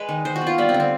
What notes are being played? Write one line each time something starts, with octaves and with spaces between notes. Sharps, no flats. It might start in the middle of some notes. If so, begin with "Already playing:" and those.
Already playing: G#3 B4
D#3
D#3 C5
F#4
B3
F4
G3 B3
C4
D3
C4